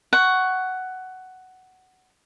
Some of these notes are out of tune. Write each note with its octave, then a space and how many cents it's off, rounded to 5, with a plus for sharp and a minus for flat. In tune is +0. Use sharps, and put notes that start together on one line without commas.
F#5 +10 C#6 +0